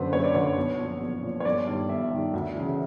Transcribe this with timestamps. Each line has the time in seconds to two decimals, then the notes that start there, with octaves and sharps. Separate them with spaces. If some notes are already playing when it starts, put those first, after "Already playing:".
Already playing: F#1 F#2 D3 B4 C5
0.13 F#1 C#5
0.24 D5
0.34 F#2 D3 C#5
0.57 B1
0.78 A#2 F3
1.01 B1
1.23 A#2 F3
1.40 C#5
1.45 G1 D5
1.67 G2 D#3
1.89 G1 E5
2.11 G2 D#3
2.33 D2
2.55 C#3 E3